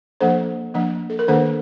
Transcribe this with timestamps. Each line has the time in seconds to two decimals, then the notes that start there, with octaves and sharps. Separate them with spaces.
0.21 F3 A#3 D4 A4 C5
0.74 F3 A#3 D4
1.10 A4
1.19 A#4
1.28 D#3 A#3 D4 A4 C5